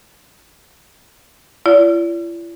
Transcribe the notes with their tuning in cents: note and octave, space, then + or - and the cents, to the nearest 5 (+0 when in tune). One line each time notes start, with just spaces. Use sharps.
E4 +45 D5 -35